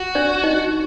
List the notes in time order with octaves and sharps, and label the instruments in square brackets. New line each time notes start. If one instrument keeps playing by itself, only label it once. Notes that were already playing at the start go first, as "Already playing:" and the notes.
Already playing: [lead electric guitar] F#4
[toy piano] D4 D5
D#4 D#5